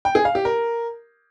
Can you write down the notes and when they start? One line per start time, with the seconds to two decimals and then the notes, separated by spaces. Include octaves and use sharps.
0.05 G5
0.15 G#4
0.25 F5
0.35 G4
0.45 A#4